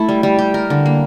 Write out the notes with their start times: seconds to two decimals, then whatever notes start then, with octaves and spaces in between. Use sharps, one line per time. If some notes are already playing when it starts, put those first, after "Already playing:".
Already playing: A3 E4
0.09 G3
0.23 G3
0.39 G4
0.54 A#4
0.70 D3
0.86 A#3